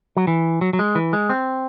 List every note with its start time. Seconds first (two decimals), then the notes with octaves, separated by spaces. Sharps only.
0.17 F#3
0.27 E3
0.61 F#3
0.73 F#3
0.79 G#3
0.95 E3
1.13 G#3
1.30 C4